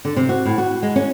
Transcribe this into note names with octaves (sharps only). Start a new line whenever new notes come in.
D3
C3
F#4
A2
F#4
G#3
C#4